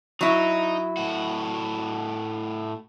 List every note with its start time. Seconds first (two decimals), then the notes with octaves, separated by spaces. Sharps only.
0.21 F#3 D#4 E4
0.97 A2 F#4